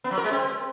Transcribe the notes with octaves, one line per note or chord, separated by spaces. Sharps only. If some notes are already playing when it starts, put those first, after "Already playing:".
B3
F#3
A#4
G#3
C4